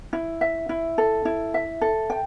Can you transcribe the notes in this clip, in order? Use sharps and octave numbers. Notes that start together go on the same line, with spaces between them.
E4
E5
E4
A4
E4
E5
A4
G5